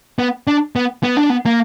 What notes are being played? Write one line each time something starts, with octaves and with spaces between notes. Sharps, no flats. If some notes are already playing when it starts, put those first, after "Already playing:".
B3
D4
B3
B3
D4
B3
A#3